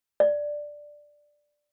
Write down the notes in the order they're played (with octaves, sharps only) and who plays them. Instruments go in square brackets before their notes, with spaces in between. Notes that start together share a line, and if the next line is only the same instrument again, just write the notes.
[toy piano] D5